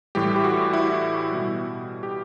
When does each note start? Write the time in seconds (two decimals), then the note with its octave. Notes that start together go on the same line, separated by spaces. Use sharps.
0.15 A2 E3 G3 G4
0.36 G4
0.44 F#4
0.73 E4
1.31 B2 G3
2.03 G4